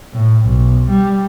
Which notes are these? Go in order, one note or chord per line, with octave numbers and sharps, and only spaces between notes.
A2
B1
G3